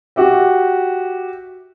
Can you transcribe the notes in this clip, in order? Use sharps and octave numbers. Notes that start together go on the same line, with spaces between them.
F#4 G4 E5